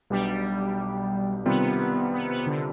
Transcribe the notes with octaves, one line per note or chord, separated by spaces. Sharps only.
B1 B2 G3 B3 D4 G4
C3 D#3 G3 B3 C4 F4
B3
B3
D3